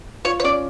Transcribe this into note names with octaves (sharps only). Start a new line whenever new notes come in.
F4 C#5
C#5
C#4 D5